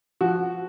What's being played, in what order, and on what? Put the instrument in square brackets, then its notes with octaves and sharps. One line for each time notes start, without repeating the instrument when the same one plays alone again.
[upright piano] F3 F#4